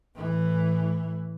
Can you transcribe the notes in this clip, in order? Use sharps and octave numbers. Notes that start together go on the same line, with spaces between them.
A2 E3